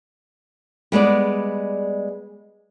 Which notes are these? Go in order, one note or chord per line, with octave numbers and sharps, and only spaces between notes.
G3 G#3 B3 D5